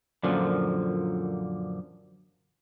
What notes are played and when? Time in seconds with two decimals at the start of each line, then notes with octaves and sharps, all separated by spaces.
0.23 F#2 A#2 D3 F3